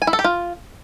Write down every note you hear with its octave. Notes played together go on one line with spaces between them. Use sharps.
G#5
E4
A4
G4
F4